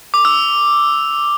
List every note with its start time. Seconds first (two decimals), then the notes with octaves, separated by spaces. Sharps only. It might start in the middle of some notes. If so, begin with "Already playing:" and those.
0.14 D6
0.25 E6